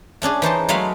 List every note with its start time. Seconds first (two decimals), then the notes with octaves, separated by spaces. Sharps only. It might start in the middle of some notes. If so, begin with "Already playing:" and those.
0.22 A3 C#4 D4 G#4
0.42 E3 D#4 C5 A5
0.69 F#3 G#3 A3 C#5 F5 B5